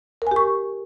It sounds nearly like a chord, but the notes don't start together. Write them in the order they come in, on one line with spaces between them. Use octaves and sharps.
A#4 G#5 G4 C#6